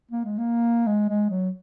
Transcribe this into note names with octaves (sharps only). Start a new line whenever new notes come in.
A#3
G#3
A#3
G#3
G#3
F#3